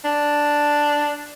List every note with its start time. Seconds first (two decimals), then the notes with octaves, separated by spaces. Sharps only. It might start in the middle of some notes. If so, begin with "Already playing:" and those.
0.05 D4